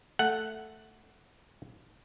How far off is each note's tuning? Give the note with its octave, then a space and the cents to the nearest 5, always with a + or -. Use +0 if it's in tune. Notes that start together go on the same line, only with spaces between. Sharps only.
A3 +0 F#5 +0